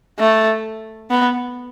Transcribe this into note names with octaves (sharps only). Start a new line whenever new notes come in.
A3
B3